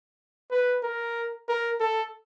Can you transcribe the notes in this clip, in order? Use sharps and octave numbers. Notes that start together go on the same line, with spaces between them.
B4
A#4
A#4
A4